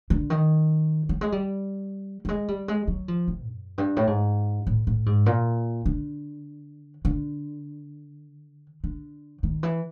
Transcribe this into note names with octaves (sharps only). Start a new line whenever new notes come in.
D3
D#3
G3
G#3
G3
G3
G#3
G3
G#3
F#3
F3
C3
F#2
G2
A2
G#2
A2
A2
G#2
A#2
D3
D3
D3
D#3
E3